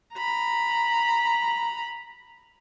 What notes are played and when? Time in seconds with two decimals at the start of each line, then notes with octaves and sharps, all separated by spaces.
0.14 A#5 B5